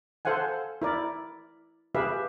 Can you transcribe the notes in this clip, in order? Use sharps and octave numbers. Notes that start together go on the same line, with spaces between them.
A4 C5 F5 F#5 G#5
E4 A#4 D5
G4 G#4 B4 E5 F5